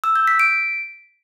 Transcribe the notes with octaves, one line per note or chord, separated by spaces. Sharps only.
E6
G6
B6
D7